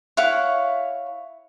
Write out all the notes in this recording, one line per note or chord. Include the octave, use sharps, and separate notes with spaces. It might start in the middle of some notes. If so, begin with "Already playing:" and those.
E4 C#5 F5 F#5